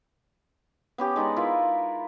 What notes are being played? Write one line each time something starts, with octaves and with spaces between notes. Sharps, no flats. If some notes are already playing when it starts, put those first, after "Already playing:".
B3 C#4 G4
G#3 D#4 D5 D#5
E4 F4 A#4 B4